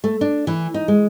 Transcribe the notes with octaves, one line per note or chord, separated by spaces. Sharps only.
A3
D4
E3
D#4
G#3